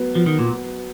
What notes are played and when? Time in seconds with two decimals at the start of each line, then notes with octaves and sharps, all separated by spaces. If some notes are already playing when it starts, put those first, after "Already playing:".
Already playing: F#3 B3
0.15 F3
0.26 D#3
0.39 A#2